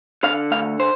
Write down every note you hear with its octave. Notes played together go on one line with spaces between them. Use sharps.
D3 F5
D2 F5
C5